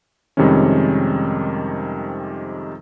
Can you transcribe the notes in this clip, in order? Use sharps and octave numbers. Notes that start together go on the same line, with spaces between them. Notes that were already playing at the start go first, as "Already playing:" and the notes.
F2 C3 D#3 G3 G#3 C#4